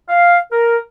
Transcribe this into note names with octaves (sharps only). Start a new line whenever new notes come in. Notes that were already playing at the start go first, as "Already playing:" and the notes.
F5
A#4